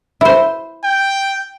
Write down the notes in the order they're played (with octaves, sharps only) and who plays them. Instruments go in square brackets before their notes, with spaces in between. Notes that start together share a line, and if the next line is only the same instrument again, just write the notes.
[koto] E4 C5
[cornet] G5